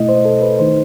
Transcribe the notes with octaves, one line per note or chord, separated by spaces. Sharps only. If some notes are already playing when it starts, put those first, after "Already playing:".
Already playing: B2 A3 E4 D#5
C5
A4
B4
D#3 A3 D#4 C5